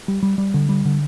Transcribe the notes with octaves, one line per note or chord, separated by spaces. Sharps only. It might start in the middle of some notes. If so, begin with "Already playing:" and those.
G3
G3
G3
D3
G3
D3